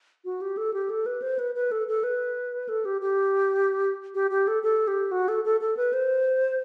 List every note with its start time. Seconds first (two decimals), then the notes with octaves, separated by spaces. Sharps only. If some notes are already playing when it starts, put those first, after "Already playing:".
0.25 F#4
0.41 G4
0.57 A4
0.73 G4
0.90 A4
1.06 B4
1.22 C5
1.39 B4
1.55 B4
1.71 A4
1.88 A4
2.03 B4
2.69 A4
2.85 G4
3.01 G4
4.14 G4
4.31 G4
4.47 A4
4.63 A4
4.87 G4
5.11 F#4
5.28 A4
5.45 A4
5.61 A4
5.77 B4
5.93 C5